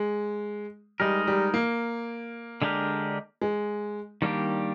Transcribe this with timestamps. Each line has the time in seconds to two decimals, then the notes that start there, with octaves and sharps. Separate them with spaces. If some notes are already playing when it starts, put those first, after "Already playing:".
Already playing: G#3
1.00 G3 G#3 D#4 A#4
1.27 G3
1.54 A#3
2.62 D3 G#3 D4 G4 A#4
3.42 G#3
4.22 D#3 G3 A#3 D4 G4